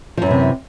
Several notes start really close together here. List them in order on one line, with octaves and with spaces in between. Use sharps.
F3 F#2 E3 C3